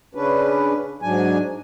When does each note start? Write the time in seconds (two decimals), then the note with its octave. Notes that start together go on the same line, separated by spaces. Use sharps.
0.15 C#3 C#4 D4 B4
1.02 G#2 F#3 D4 G#5